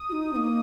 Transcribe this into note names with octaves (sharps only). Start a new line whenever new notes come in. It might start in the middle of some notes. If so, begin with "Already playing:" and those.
Already playing: D#6
F#4
D#4
C4
A#3